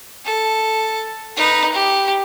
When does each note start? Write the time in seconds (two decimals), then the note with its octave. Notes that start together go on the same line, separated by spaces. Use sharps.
0.25 A4
1.37 D#4 B4
1.73 G4